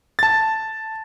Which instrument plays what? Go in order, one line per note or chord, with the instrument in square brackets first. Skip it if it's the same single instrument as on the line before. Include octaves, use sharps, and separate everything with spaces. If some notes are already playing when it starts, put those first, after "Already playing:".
[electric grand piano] A5 A6